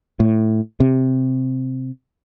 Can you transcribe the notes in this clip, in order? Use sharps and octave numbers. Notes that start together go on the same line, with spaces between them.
A2
C3